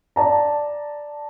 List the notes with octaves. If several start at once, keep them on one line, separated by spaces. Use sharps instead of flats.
D5 A5 A#5